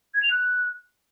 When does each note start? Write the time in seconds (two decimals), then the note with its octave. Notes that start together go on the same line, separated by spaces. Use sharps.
0.14 G#6
0.22 F7
0.31 F#6